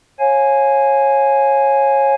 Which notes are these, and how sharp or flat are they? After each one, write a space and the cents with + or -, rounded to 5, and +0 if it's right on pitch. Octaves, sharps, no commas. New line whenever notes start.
C#5 -25 F5 +0 G#5 +10